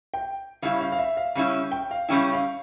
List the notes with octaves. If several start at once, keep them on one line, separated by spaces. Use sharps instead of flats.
G5
C#3 G3 C#4 E4 F5
F5
F5
E5
F5
C#3 G3 C#4 E4 F5
G5
F5
C#3 G3 C#4 E4 G5
F5